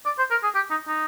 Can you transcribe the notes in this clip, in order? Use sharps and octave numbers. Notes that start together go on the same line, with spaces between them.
D5
C5
A#4
G#4
G4
D#4
D#4